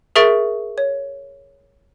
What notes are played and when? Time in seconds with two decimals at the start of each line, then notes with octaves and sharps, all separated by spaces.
0.16 G#4 A#4 E5 C#6 A6 D7
0.78 C#5